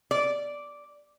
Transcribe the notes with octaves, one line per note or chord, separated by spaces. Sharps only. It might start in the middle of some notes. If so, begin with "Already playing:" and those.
D5